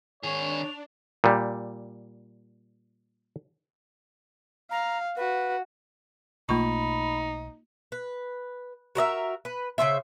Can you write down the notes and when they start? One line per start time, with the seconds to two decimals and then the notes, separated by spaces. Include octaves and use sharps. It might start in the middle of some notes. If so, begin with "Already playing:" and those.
0.23 D#3 D4 G#4 C#5 F7
1.24 A#2 G3
4.71 F5 A#5
5.17 F#4 B4
6.49 B1 A3 A#3 D#4 F4 B5 C#6
7.92 B4
8.95 F#4 A#4 D#5 E5
9.45 B4
9.78 C#3 F3 C5 E5